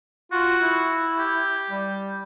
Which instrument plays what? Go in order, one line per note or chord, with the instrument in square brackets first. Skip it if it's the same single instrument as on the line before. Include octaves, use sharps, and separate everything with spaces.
[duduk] F4 [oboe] F#4
[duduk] E4
[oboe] G4
[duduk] G3